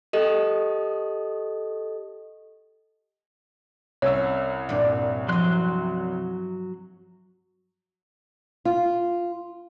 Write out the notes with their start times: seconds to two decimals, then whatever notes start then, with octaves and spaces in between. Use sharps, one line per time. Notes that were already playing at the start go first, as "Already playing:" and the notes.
0.13 G4 A4 D#5
4.02 C2 C#4 C#5 E6
4.69 G2 A#2
5.29 F3 F#3 C4 D#5 C6 F#6
8.65 F4